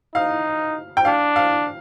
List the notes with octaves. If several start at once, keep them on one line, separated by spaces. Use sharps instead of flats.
D#4 F5
G5
D4 F5
F5